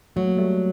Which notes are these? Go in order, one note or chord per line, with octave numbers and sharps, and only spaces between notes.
F#3 A3
A#3
G3 A3